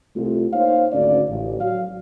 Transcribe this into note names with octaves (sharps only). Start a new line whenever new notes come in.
C2 A3 F4
A#3 D#4 C5 C#5 F5
G#1 D2 C#4 D5
A1
F#3 F5